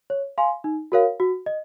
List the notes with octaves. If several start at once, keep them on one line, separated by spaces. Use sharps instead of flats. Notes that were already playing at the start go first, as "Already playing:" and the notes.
C#5
F5 G#5 C6
D#4
F#4 A#4 C#5 F5
F#4
D#5